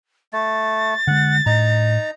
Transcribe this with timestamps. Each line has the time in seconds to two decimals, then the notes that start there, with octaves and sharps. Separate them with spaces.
0.33 A3 A6
1.07 D3 G#3 F#5
1.46 A2 D#4 A#5